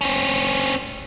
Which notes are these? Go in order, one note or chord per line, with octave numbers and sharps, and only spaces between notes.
C4 C#4